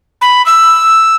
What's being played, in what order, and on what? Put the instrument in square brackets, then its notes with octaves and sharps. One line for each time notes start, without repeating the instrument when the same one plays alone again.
[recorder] B5
E6